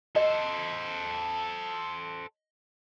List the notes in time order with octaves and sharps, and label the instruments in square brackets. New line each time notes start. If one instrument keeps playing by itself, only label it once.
[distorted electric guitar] A4 C5 [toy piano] D#5